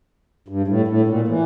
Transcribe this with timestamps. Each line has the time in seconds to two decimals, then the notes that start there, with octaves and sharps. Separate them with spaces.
0.48 G2
0.68 A2
0.88 A2
1.07 A#2
1.28 E3